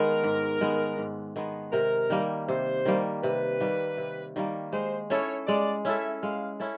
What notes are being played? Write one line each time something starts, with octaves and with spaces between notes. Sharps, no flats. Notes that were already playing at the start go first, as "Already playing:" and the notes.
Already playing: D#3 G#3 B3 A#4
G#2
D#3 G#3 B3
G#2
D#3 G#3 B3
C3 A#4
D#3 G3 A#3
C3 C5
D#3 G3 A#3
C3 B4
D#3 G3 A#3
C3
D#3 G3 A#3
G#3 C5
C#4 E4 A4 C#5
G#3 D5
C#4 E4 A4 E5
G#3 F5
C#4 E4 A4